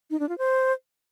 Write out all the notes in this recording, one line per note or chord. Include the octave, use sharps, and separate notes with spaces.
D#4
D4
F4
C5